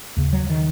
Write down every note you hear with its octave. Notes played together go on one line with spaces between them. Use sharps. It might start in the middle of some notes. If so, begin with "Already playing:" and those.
D#2 C#3
F#3
D#3